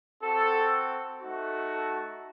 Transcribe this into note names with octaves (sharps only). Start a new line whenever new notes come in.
C4 F#4 A4
A3 D#4 F#4
A4